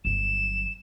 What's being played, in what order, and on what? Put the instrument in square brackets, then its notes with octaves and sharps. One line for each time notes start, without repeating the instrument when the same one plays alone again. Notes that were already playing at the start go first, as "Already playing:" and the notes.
[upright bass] G1 F#3 [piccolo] E7